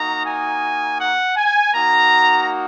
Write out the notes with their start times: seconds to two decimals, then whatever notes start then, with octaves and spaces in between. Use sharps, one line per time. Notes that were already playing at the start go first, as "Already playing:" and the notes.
Already playing: A#3 D#4 F#4 A#5
0.24 G#5
0.99 F#5
1.36 G#5
1.73 A#3 D#4 F#4 A#5